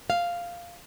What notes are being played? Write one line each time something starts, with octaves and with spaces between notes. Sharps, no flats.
F5